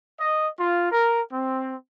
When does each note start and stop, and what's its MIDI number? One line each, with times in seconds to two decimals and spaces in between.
0.20 0.48 75
0.59 0.90 65
0.92 1.21 70
1.33 1.74 60